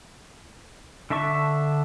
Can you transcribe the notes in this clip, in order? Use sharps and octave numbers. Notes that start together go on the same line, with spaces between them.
D3 D4 E5 A5 C#6